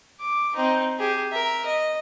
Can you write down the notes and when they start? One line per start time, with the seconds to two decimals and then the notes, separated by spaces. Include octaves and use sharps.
0.20 D6
0.56 C4 D#4
0.99 G4 G#4
1.32 A#4 E5
1.66 D#5